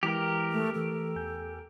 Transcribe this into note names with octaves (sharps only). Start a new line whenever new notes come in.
E3 G#3 E4 G4 A#4
A3
E3 A3 A4
E2 G#5 G6